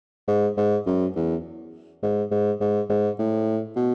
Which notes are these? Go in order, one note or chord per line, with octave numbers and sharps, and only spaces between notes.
G#2
G#2
F#2
E2
G#2
G#2
G#2
G#2
A2
B2